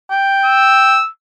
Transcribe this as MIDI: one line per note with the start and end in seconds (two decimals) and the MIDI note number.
0.11 0.98 79
0.45 1.09 88